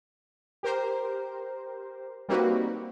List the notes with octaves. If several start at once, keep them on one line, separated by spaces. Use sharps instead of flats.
G4 A#4 C5
G3 A#3 C4 D#4 F#4 B4